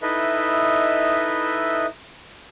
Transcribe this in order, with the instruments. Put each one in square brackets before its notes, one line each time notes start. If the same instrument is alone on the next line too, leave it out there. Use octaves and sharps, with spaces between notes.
[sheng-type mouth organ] D#4 E4 A4 B4 D#5 E5